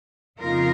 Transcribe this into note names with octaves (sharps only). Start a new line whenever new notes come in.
F2 C#3 A#3 D#4 F4 A#4